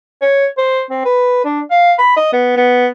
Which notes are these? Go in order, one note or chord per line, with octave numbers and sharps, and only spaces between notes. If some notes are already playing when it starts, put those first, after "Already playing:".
C#5
C5
C4
B4
D4
F5
B5
D#5
B3
B3